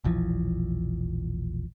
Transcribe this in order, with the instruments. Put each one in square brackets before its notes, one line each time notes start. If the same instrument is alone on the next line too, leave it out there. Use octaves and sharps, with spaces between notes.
[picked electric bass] E1 A#1 E3 F3